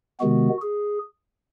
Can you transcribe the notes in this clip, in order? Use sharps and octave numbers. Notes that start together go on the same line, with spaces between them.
C3 D#3 G#3 B3 F#4
G#4